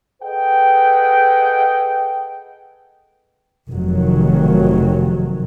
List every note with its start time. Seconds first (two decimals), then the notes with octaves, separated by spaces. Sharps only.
0.22 G#4 A4 B4 D#5 F#5 G5
3.70 F1 D#3 F#3